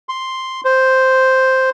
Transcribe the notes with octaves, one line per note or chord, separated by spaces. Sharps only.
C6
C5